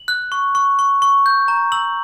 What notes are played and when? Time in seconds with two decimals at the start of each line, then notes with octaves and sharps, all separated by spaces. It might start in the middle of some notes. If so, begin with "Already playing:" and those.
Already playing: F#7
0.08 F#6
0.32 C#6
0.55 C#6
0.79 C#6
1.02 C#6
1.26 G6
1.48 A#5
1.72 E6 F#7